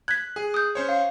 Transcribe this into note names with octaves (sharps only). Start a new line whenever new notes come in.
F#6 G#6 B6
G#4
D#6 G6
C#4 C5 C#5
F5